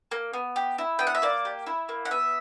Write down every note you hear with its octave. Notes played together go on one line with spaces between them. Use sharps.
A#3
B3
G4
E4
B3 G5
F#5
E5
A#3 D5
G4
E4
A#3
F#5
B3 E5